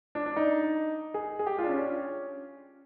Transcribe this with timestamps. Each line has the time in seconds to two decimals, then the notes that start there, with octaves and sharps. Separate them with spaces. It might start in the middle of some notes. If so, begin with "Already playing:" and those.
0.15 D4
0.26 D4
0.36 D#4
1.14 G#4
1.39 G#4
1.47 G4
1.58 F4
1.64 D4
1.69 C#4